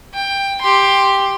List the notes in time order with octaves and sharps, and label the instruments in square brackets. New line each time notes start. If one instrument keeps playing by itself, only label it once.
[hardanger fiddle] G5
G4 C6